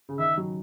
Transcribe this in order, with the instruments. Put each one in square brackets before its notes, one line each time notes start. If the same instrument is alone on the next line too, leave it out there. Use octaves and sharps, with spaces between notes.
[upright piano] C#3
[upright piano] D#3 [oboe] E5
[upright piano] F#3